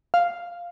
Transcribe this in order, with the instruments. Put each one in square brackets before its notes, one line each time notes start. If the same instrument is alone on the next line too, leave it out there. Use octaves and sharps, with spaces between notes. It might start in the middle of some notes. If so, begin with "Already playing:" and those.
[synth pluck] F5